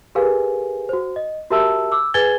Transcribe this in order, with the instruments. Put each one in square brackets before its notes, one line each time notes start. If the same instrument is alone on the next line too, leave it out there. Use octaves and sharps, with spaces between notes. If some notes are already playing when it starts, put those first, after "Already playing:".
[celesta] G4 G#4 A#4 B4 F5 G#5
F#4 C5
D#5
F#4 G4 A#4 E5 A5 E6
D6 E6
G#4 B4 G#5 G#6 A6 G7